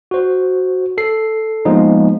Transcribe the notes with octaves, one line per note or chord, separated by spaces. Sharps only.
F#4 C5
A4 C7
F3 G#3 A#3 B3 D#4